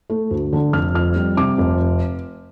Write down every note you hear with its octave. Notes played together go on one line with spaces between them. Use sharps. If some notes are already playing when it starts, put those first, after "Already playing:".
A3
D2
D3
F1 F6
F2 F6
G3
C3 D6
F1